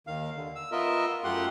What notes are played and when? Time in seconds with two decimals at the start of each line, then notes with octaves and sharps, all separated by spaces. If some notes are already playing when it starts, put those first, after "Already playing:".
0.07 D#2 D#3 F5
0.36 D3
0.56 E6
0.72 B3 F4 A#4 D#5 E5
1.24 F#2 A3 F4 G4 F#5 C6